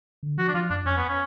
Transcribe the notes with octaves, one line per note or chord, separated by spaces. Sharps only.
D3
F3 F#4
D4
F3 F4
F#2 D4
F2 C#4
B3
C#4